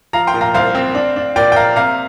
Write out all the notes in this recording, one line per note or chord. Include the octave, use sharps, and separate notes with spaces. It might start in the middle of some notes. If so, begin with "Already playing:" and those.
F3 F5 A#5
G5 C6
A#2
F5 A#5
C2 C5 F5
C4
D4
D4
A#2 D5 G5
G5
A#3 F5 A#5
C3 F5 A#5